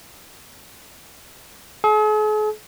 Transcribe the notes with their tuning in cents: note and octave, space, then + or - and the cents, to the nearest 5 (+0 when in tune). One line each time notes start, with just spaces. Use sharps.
G#4 +45